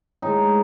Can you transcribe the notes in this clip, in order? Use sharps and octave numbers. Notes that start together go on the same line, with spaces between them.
A2 E3 G#3 D#4